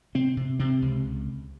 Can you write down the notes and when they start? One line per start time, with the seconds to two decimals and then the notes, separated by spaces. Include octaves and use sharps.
0.15 C3 C4
0.37 C3
0.59 C3 C4
0.82 C#2